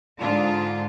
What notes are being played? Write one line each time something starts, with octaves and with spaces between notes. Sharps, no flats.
G#2 D3 D4 F4